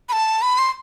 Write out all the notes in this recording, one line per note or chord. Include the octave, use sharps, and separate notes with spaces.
B5
A5
B5
C6